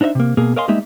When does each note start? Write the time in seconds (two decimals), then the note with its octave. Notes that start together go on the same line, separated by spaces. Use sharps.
0.01 D4 D#4 C5 D#5 E5
0.15 C3 A#3
0.37 B2 A#3 G#4
0.56 A#4 C#5 D#5 F5 G#5 C6
0.68 G3 G#3 A#3 D#4 D#5 E5